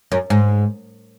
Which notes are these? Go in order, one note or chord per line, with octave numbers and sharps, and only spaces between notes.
F#2
G#2